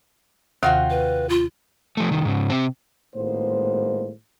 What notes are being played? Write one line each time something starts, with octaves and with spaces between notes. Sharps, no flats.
D#2 C3 D#3 F4 F#4 G5
B4
F4
F3 A3
C2 D#3
G#2 C#3
C3 C4
G#1 A2 G#3 A#3 B3 C5